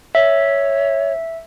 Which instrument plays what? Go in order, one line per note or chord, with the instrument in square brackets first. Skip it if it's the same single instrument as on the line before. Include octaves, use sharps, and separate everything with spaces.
[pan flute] C#5 [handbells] E5